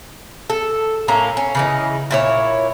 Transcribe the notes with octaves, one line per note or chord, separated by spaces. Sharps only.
A4
A2 A#3 C#4 A#5
C#4
C#3 E3 D#4
A#2 E4 C#5